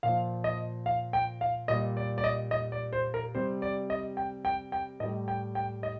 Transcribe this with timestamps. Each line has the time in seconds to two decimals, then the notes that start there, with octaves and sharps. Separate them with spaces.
0.03 A#2 F3 F5
0.44 D#5
0.86 F5
1.13 G5
1.41 F5
1.68 A#2 G3 D#5
1.97 D5
2.18 D5
2.24 D#5
2.51 D#5
2.72 D5
2.93 C5
3.14 A#4
3.35 C3 G3 C5
3.62 D5
3.90 D#5
4.17 G5
4.45 G5
4.72 G5
5.00 A2 D#5
5.04 G3
5.28 G5
5.55 G5
5.83 D#5